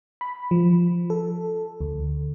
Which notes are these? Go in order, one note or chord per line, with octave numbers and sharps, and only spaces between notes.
B5
F3
A4
D2